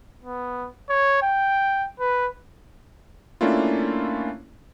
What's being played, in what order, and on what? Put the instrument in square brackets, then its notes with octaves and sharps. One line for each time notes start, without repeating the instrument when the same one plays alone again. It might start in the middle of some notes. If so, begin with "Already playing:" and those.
[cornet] B3
C#5
G5
B4
[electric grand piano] A3 A#3 C#4 D4 E4 F4